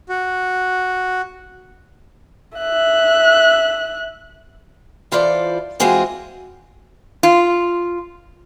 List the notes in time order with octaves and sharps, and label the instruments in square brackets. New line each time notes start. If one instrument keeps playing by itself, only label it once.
[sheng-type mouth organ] F#4
[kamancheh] E5 F#6
[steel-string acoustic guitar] E3 F4 A4 C5 D5
E3 G#3 C4 F4 F#4 G#4
[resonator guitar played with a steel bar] F4